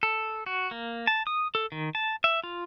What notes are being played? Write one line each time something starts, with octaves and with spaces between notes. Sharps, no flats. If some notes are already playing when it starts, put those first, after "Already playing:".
A4
F#4
A#3
A5
D#6
A4
D#3
A5
E5
F4